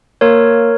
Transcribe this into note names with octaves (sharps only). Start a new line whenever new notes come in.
A#3 A#4 C#5